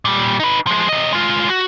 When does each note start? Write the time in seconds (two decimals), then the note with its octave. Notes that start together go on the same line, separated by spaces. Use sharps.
0.05 A#2 G3
0.40 D#4 B4
0.67 F3 G#3
0.89 C3 D#5
1.13 G#3 F4
1.50 F#4